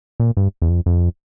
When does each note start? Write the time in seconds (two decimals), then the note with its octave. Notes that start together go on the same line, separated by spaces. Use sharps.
0.20 A#2
0.37 G2
0.62 E2
0.69 F2
0.86 F2